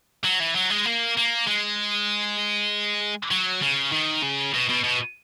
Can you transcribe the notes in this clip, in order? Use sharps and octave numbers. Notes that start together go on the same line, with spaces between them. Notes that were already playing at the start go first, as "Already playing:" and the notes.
F#3
E3
F#3
G#3
A#3
A#3
G#3
F#3
C#3
D#3
C#3
B2
B2
B2